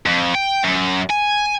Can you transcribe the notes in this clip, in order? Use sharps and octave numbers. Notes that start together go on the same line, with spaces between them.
F2
G5
F#2
G#5